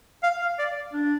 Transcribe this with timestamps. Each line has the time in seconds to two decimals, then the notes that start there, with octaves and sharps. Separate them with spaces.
0.23 F5
0.42 F5
0.59 D5
0.93 D4